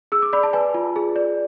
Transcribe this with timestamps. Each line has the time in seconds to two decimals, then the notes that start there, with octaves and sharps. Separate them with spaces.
0.12 G#4 E6
0.22 D6
0.33 D5 B5
0.43 A5
0.53 B4 G#5
0.74 F4
0.96 G#4
1.16 D5